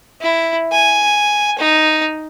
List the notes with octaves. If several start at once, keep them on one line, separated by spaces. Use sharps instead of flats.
E4
G#5
D#4